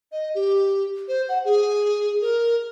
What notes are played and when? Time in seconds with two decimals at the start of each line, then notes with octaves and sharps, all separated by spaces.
0.12 D#5
0.35 G4
1.08 C5
1.29 F#5
1.45 G#4
2.21 A#4